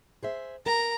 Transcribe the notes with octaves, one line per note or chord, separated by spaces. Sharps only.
G#4 C5 E5
A#4 A#5